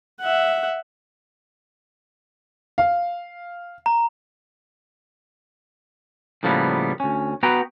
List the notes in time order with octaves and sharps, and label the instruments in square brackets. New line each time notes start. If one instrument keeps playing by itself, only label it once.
[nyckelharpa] E5 F#5
[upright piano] F5
[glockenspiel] A#5
[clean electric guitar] A2 C#3 F3 G3 A#3 B3
D2 C#4
B3 F#4 B4 G5 A#5